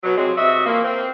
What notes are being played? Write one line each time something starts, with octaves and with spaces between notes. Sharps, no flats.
B2 F#3
C3 F3 F#3 G#3 C4
C3 F#4 D#5 E5
E3 F3 A#3
C4